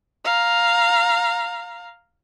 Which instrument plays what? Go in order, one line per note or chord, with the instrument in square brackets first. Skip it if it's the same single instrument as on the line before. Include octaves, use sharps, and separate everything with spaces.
[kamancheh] F5 A#5